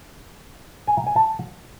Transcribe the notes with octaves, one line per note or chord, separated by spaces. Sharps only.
G#5
A#5
G#5
A5